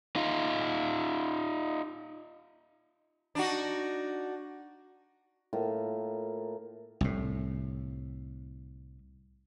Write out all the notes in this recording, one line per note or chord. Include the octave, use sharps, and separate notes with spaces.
D#4 F4
D4 D#4 F#4
A2 A#3 F4 E5
C2 A2